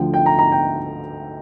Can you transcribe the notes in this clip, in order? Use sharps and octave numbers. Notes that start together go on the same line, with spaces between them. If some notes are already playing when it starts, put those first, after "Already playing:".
Already playing: D2 D3 F3 G5
G5
A#5
A#5
G5